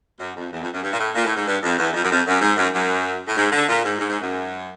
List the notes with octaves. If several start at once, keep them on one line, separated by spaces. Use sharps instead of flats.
F#2
F2
E2
F2
F#2
G2
A#2
A2
A#2
A2
G#2
G2
F2
E2
F2
F#2
F2
F#2
G#2
F#2
F#2
A2
G#2
D3
A#2
G#2
G#2
G#2
F#2